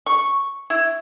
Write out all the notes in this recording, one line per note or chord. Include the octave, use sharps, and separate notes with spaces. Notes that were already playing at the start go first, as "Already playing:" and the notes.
C#6
E4